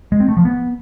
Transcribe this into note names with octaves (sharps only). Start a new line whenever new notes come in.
G#3
C4
A3
F3
B3